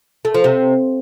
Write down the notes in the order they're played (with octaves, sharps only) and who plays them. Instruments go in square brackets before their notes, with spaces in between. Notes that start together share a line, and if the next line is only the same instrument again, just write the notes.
[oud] A3
F3
C3